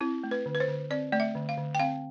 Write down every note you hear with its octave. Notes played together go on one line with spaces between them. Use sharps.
C4 E4
A3
B4
D3
B4
C5
D3
C4 D5
A3 D5
E5
D3
F5
D3
G5
C4 F5